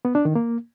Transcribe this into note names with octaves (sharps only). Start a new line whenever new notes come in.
B3
D4
D#3
A#3